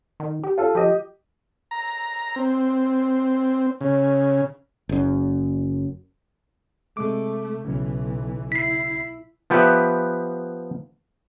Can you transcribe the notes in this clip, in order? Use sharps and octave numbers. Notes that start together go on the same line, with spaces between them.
D#3
G4
F4 A4
F3 G4 D#5
A#5
C4
C#3
F#1 F#2
C3 G#3 A3 D6
B1 C#3 E3 F#3
E4 B6 C7
F3 B3 G4 B4 E5